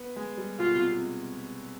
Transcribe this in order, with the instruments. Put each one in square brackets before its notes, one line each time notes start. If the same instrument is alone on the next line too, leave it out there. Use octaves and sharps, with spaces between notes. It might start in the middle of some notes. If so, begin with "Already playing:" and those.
Already playing: [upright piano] B3
G#3
G3
[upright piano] B2 [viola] F4
[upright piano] C3
C3